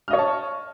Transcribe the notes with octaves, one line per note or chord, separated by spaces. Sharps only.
C#5 D#5 A5 C#6 F6